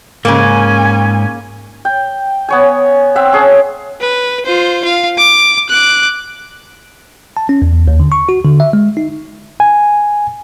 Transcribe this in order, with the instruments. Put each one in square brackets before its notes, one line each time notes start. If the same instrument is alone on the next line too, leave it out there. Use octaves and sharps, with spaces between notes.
[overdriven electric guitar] G#2 [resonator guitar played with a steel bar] C#3 A#3 [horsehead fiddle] C#4 G#5
[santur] G5
B3 C#5 G#5
C4 E5 F#5
C#4 G#4 A5
[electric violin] B4
F4 C5
F4 F5
D6
D6 F#6
[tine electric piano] A5
C#4
E2
E2
D#2
D3
C#6
F#4
D3
E5
G#3
D#4
[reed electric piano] G#5